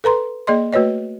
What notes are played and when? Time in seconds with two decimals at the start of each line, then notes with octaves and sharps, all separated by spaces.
0.04 A4 B4 A#5 C6
0.47 A#3 G#4 D5 D#5 C6
0.73 A3 F#4 B4 C#5 D#5